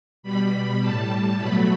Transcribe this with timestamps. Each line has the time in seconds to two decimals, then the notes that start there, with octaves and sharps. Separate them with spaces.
0.23 B2 G3 B5
0.81 A2 G3 A5
1.38 B2 F#3 A3 B5